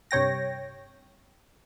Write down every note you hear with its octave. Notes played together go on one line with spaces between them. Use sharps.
G2 C3 C#5 G5 A#6